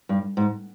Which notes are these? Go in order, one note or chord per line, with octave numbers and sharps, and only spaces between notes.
G2
G#2